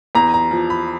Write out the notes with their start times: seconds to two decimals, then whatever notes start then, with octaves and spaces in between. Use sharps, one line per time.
0.15 E2 A#5
0.34 A#5
0.51 F3
0.70 B5